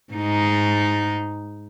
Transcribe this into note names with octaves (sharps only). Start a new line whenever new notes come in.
G#2 G#3 D#4